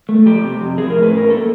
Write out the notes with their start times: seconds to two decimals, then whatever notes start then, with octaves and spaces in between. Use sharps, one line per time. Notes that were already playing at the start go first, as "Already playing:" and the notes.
0.09 A3
0.26 F3 G4
0.44 C3
0.61 F2
0.78 F3 G#4
0.90 A#4
0.95 A2
1.03 B4
1.12 C#4
1.17 A#4
1.30 A#3 A4